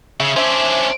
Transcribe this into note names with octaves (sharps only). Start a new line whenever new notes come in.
C#3 E5
C#4 D4 C5 E5 C6